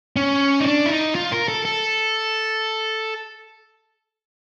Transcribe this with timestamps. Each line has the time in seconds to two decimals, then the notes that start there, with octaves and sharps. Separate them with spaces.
0.16 C#4
0.60 D#4
0.66 D4
0.86 E4
0.90 D#4
1.15 F4
1.32 A#4
1.48 A4
1.65 A4